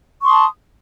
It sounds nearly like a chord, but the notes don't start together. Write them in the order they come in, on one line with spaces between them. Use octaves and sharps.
C#6 C6 D#6 A5